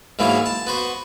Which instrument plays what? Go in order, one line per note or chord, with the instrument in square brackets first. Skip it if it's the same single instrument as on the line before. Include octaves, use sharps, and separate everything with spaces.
[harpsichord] G#2 E3 F#3 A#3 B3
A5
B3 F#4 C5